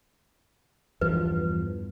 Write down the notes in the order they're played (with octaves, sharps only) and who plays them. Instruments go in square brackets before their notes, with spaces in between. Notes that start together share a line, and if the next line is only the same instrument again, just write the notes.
[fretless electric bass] E2 G2 F3 [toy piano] B4